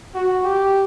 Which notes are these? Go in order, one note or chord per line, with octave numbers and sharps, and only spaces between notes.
F#4
G4